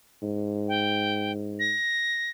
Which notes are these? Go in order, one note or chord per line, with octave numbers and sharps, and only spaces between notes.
G#2
G5
A#6